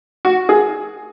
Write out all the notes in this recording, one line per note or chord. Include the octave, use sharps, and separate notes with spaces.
F#4
G#4